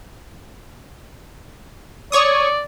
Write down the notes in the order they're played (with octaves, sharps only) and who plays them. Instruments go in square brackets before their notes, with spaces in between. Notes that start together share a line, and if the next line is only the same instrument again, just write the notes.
[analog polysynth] C#5 C#6 D#6 [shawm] D5